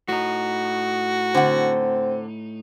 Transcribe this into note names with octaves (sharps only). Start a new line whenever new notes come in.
A2 D#4 F#4
D3 C4 F#5